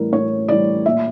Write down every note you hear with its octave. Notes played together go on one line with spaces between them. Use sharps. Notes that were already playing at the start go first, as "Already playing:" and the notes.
Already playing: A2 E3 G3 A#4
A2 C#5
E3 G3 D5
A#2 E5